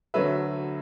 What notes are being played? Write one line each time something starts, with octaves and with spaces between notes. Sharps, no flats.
D2 D3 F#3 A3 B4 E5